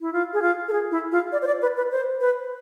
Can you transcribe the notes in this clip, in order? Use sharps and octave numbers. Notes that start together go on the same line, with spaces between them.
E4
F4
G#4
F4
A4
G#4
E4
F4
D5
C5
D5
B4
B4
C5
B4